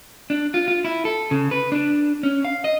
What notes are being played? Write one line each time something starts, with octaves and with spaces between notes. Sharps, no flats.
D4
F4
F4
E4
A4
C#3
B4
D4
C#4
F5
D#5